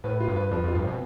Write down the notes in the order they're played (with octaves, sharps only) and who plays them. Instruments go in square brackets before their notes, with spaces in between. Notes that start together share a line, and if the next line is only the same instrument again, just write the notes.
[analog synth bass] A2 [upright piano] B4
[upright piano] F4
[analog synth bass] G2
[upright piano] B4
[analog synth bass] F2 [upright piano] F3
[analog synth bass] F2 [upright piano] F4
[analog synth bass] G2
[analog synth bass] B2 [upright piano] C4